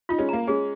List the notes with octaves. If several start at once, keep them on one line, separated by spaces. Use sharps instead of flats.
D#4 F4
G#3 C#4
A#3 A#5
G#3 C#4 G#4